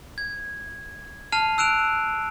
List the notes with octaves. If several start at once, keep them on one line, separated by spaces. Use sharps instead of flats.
G#6
A5 F6 C7 D#7 F7
E6 F#6 D7 E7 F7